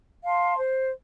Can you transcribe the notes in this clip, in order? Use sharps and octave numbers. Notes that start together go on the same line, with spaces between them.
F5 A5 C6
C5